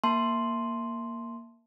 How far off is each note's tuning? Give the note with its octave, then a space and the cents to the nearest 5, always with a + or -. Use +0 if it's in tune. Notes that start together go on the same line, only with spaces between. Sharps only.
A#3 +0 A5 +0 C6 +0